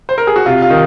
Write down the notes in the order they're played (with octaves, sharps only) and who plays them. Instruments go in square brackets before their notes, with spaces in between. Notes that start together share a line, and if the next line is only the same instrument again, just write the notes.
[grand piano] C5
A#4
G#4
F#4
C3 F4
F4
D#3